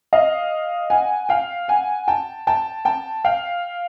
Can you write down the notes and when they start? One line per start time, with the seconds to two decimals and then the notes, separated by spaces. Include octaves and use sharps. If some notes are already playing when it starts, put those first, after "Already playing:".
0.13 D#5 F5
0.90 F#5 G#5
1.29 F5 G5
1.68 F#5 G#5
2.08 G5 A5
2.47 G5 A5
2.85 G5 A5
3.25 F5 G5